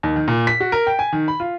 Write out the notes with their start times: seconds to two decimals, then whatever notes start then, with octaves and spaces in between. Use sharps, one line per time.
0.03 D#2
0.16 D#3
0.28 A#2
0.47 B6
0.60 F#4
0.72 A#4
0.87 G5
0.99 G#5
1.13 D#3
1.28 B5
1.40 F4